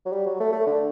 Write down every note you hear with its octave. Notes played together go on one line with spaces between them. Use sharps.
F#3
G3
F#3
A3
A3
D3